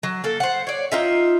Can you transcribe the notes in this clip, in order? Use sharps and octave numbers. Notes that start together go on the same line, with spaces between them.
F#3
A#3 A4
C5 F#5
C#5 D5
D#4 F4 E5